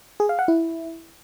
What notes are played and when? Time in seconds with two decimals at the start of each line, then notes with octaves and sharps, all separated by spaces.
0.20 G#4
0.29 F5
0.39 F#5
0.48 E4